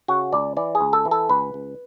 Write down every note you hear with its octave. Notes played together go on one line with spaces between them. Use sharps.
C#3 F#4
C#2 D5
E3 D5
G#4
C#2
A4
E3
A4
C#2 B4
C#2